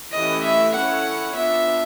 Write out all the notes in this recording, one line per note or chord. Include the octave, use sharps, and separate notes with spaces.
E3 A3 C#4 E4 G4 D#5
E5
C#4 E4 A4 C#5 F#5
B3 D4 F4 E5